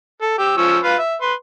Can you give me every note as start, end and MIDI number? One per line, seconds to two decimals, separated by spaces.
0.22 0.37 69
0.38 0.53 67
0.38 0.53 88
0.57 0.78 53
0.57 0.78 61
0.57 0.78 88
0.84 0.96 65
0.84 0.96 71
0.84 0.96 77
0.98 1.15 76
1.22 1.33 71
1.22 1.33 84